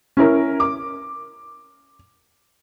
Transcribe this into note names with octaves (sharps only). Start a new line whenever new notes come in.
C#4 E4 A#4
D6